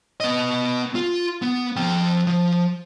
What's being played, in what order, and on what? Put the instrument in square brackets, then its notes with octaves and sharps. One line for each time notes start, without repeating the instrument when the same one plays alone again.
[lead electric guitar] B3 D#5
F4
B3
F3 G5
F3